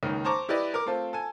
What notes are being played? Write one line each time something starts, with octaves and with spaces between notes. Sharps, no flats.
C#2 D#3 A#3
C5 A5 A#5 C#6 D6
E4 G4 B4 D5 D#5
A#4 D6
A3 C4 F4 A4
A4 G#5